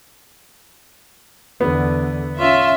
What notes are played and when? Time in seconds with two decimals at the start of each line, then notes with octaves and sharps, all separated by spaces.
1.61 E2 D3 B3
2.40 C#4 F4 E5